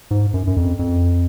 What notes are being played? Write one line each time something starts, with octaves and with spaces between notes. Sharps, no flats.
G#2
F#2
F#2
F2
F2